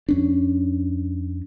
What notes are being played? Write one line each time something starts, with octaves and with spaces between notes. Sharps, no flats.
F2 C#4 D4